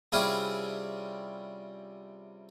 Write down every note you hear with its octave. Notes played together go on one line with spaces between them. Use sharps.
C3 G3 C#4 E4 F4 G#4